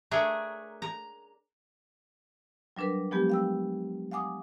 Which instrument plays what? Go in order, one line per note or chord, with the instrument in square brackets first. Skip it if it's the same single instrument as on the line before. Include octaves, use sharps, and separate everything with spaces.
[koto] A3 D4 G#4 A#4 C#5
A#5
[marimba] F#3 G3 D4 A#4 B4
F3 F#3 G#3 B3 G4
F5 G5 E6
F5 F#5 G#5 D6 D#6